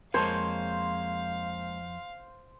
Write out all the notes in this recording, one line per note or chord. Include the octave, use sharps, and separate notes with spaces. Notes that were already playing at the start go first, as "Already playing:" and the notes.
F2 G#3 A#3 A#4 C5 C#5 F5 A5